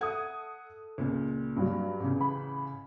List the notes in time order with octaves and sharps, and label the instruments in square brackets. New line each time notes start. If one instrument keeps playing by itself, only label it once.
[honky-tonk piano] A4 D#6 [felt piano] E5 F#5 G#6
[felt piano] C#2 A#2
[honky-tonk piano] G2 F#3
[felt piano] A1 C#3
[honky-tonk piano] B5